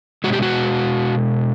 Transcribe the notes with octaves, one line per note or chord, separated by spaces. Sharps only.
B2 G#3 F#4
G4
F#4